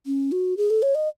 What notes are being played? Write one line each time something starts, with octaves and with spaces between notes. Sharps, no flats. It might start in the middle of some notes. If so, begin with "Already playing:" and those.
C#4
F#4
G#4
A4
C#5
D#5